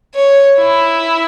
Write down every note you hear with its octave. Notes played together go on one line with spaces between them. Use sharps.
C#5
E4